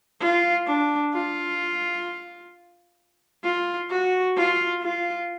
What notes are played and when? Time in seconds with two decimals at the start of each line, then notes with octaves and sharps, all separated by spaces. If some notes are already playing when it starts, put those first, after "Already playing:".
0.21 F4
0.67 D4
1.13 F4
3.44 F4
3.90 F#4
4.36 F4
4.82 F4